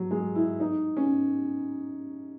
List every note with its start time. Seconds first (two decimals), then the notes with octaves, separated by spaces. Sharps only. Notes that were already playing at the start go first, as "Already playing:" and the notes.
Already playing: F#3
0.11 G#3
0.35 E4
0.60 D#4
0.97 C#4